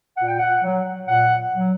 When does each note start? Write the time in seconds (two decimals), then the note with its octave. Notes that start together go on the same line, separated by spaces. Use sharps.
0.17 A#2 F#5
0.28 G5
0.39 F#5
0.63 F#3
1.09 A#2 F#5
1.55 F#3